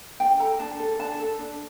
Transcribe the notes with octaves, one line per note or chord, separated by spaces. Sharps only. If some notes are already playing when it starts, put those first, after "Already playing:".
D4 G5
A4 A#5
D4 A5
A4
D4 A5
A4
D4